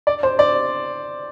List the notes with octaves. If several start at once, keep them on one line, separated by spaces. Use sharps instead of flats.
D5
C5
D5